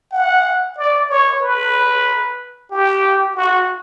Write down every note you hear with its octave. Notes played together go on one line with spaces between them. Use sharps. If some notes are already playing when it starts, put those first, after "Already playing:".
F#5
D5
C#5
B4
G4
F#4